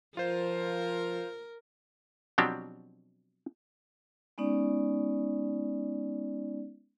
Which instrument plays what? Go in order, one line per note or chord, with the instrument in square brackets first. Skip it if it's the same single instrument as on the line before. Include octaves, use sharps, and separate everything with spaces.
[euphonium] F3 [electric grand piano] F4 C5 [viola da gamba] A#4
[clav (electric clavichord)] B2 F3 F#3 C4 D4 G4
[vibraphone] G#3 B3 C#4 D#4 D5